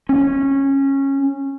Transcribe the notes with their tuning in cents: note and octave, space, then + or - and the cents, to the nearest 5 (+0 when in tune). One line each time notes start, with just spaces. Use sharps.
C#4 -15